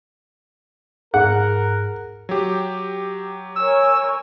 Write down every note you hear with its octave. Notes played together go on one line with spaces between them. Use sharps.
G#2 G#4 A#4 F#5
F#3 G4
A#4 C#5 G#5 E6